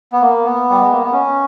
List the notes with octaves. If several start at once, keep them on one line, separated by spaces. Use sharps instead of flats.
B3
A#3
B3
G3
G#3
A#3
B3
C#4